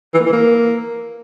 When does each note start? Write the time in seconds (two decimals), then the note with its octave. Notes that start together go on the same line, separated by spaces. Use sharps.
0.14 E3
0.20 A#3
0.26 E3
0.33 A#3